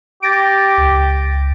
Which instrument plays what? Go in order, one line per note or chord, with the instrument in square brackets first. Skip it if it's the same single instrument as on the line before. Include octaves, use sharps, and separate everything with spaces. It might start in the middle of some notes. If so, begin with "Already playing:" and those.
[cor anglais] G4 [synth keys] A6 A#6 D7
[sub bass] C#2